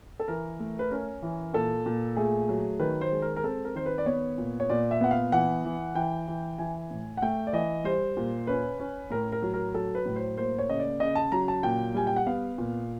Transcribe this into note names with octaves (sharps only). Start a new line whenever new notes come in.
A4
E3 A#4
A3
B4
C#4 A#4
E3
A#2 A4
A#2
A3 G#4
F#3
D#3 B4
C5
G#3
A#4
A#4
C4 A4
A#4
D#3 C5
B4
D5
B3 C#5
A#2
C#5
A#2 D5
E5
B3 F#5
F5
E3 F#5
E3
E3 G5
E3
E3 G#5
A2
F#5
A3 G5
D5
E3 D#5
G3 C5
A#2
C#4 B4
C#4
A2 A#4
A#4
F#3
A#4
F#3 A4
B4
A2
C5
A#3 C5
C#5
C#3 D#5
D5
C#3 D#5
A5
F#3 A#5
A5
A#2 G5
G3 G#5
G5
F#5
B3 F5
A#2